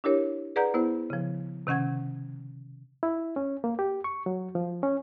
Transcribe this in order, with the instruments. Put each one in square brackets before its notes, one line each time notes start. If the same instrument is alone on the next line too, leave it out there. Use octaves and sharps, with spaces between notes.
[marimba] D4 E4 G4 A#4 C#5
G#4 B4 D5 F#5 A#5 G6
B3 E4 C5
C#3 F3
C3 D#3 C#4 F#5 G#6
[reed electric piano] E4
C#4
A#3
G4
C#6
F#3
F3
C#4